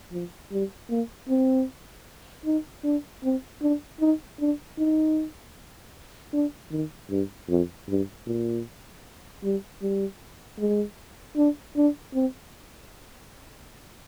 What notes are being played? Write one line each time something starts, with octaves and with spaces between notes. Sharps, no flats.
F3
G3
A#3
C4
D#4
D4
C4
D4
D#4
D4
D#4
D4
D#3
G2
F2
G2
A#2
G3
G3
G#3
D4
D4
C4